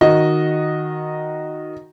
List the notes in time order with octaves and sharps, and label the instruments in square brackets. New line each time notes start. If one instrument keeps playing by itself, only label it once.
[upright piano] D#3 F#4 D#5